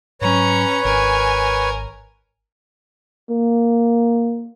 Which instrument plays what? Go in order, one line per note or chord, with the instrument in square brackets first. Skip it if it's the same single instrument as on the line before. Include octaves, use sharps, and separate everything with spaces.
[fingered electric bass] G#2 F#3 [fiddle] C#4 A#5 [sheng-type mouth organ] B4 C#5
[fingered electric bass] G#1 [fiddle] A#4 G#5
[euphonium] A#3